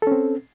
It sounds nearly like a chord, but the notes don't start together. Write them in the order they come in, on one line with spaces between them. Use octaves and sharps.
A4 C#4 C4